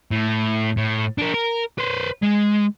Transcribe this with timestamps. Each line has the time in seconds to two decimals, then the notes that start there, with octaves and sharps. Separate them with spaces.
0.11 A2
0.77 A2
1.18 D4 A#4
1.34 A#4
1.79 B4 C5
2.23 G#3